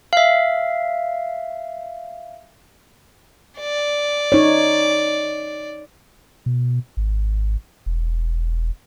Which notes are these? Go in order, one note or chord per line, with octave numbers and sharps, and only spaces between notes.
E5 F5
D5
D#4 C#5
B2
G#1
E1